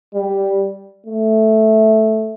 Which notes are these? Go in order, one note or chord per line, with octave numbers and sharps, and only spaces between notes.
G3
A3